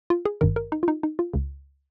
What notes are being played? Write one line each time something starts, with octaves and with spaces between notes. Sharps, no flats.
F4
G#4
G#1 G2 D#3 A#4
A#4
D#4
F4
D#4
D#4
F4
C#2 C#3